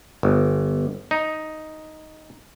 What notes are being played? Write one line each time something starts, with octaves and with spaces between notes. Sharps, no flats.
G1
D#4